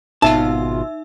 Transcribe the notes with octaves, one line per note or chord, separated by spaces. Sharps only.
G#1 B2 D#4 F4 E5 A5 E6